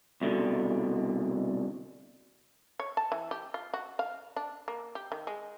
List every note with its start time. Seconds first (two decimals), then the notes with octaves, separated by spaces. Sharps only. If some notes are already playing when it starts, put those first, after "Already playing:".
0.21 C2 B2 D3
2.79 C#5
2.97 A5
3.12 E3
3.31 G4
3.54 F4
3.74 F#4
3.99 F5
4.36 D4
4.68 A#3
4.95 G4
5.12 D#3
5.27 G#3